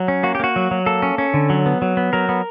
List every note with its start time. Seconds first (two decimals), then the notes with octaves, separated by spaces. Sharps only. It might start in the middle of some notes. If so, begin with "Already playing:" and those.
Already playing: F#3
0.08 C#4
0.23 A#3 F#4
0.35 G4
0.40 A#3 F#4
0.56 F#3
0.71 F#3
0.86 A#3 A4
1.02 C#4
1.18 C#4
1.34 D3
1.50 F#3
1.66 B3
1.82 F#3
1.97 B3
2.13 F#3 A#4
2.29 B3